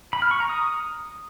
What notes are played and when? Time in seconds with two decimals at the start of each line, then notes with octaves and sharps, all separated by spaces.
0.13 B5
0.22 F6
0.31 C#6
0.40 A#5
0.49 D#6